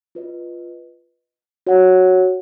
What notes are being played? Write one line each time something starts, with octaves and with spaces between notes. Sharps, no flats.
F4 B4 D#5
F#4 C#5 F#5